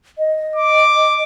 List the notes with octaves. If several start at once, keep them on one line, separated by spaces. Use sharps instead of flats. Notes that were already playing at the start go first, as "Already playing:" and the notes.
D#5
D6